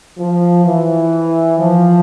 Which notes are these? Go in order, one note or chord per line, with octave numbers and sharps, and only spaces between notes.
F3
E3
F3